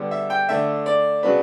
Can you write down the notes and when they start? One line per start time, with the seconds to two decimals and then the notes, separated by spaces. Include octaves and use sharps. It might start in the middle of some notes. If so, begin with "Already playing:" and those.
Already playing: D3 G3 B3 D4
0.11 E5
0.30 G5
0.49 D3 A3 D4 E5
0.86 D5
1.23 C#3 F#3 B3 D4 B4